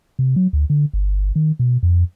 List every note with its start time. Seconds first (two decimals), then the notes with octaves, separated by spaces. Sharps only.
0.19 C3
0.36 F#3
0.53 D2
0.70 D3
0.93 G1
1.36 D#3
1.59 B2
1.83 F2